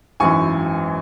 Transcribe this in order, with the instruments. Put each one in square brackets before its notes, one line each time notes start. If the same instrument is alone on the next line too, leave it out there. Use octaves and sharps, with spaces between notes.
[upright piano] G#1 F#2 E3 G#5 C#6